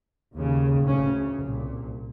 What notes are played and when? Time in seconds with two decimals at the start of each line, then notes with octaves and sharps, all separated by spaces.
0.34 D#2 C#3
0.87 D2 C#3 C#4
1.41 C2 A#2